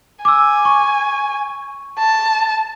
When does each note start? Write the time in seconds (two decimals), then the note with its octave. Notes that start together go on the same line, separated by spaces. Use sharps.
0.25 G#5 D6 E6
0.65 C#6
1.99 A5